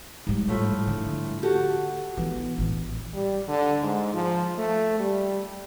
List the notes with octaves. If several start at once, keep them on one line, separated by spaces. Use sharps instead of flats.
G#2 G3
A2 F3 A3
D3
F#4 G4 A4
E3 B3
A1 E3
G3
D3
G#2
F3
A3
G3